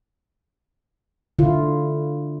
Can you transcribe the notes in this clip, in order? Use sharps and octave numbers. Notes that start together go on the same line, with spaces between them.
D3 E4 F4